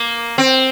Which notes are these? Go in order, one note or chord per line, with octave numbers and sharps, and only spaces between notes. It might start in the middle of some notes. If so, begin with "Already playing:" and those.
Already playing: A#3
C4